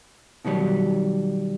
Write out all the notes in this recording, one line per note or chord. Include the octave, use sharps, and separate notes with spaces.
B2 D#3 F#3 G3